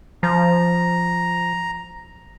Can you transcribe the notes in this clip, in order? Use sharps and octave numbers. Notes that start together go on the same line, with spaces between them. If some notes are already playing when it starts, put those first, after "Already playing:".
F3 A#5